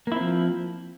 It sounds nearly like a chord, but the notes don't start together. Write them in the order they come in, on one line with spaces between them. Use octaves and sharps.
A#3 E4 C4 F3